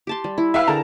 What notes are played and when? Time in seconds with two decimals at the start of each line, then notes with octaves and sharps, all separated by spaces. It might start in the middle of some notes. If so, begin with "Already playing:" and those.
0.07 G4 A5 C6
0.24 G3
0.38 E4
0.54 B4 E5 F5 G5 G#5 B5
0.67 D3 G#4 A#4 A5 A#5